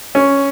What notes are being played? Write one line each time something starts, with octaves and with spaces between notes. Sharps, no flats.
C#4